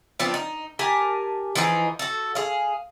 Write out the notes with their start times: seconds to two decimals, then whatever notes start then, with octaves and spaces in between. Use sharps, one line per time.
0.20 F3 B3 C4 D4
0.34 D#4
0.79 G4 A#4 G#5 A5
1.55 E3 F3 D#4 G#4
1.99 F#4 A4
2.35 G#4 F5